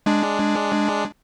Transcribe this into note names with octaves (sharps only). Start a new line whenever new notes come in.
G#3 D4